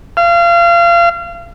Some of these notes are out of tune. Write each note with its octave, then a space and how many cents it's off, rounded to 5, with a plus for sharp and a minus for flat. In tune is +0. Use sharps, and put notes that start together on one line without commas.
F5 -30